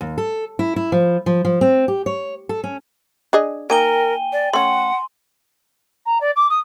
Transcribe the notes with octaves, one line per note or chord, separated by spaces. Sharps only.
D#2
A4
E4
E4
F3
F3
F3
C4
G4
C#5
A4
C#4
D4 G#4 D#5
A#3 D#4 A#4 G5 G#5 D#7 G7
D5
A3 C#4 F#5 C6
A#5
D5
D6
D#6